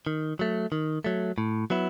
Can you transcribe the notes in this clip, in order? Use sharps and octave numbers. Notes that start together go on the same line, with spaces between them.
D#3
F#3 A3
D#3
F#3 A3
A2
F#3 B3 E4